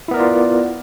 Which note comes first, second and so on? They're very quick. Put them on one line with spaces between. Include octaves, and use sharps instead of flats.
E4 B3 A#4 D5 F4